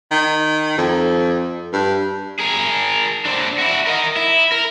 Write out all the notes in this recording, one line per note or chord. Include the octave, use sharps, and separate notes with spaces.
D#3
F2
G2
G#4 A#4
C4 D4
E4 F#4
A#4 D#5
E4
A#4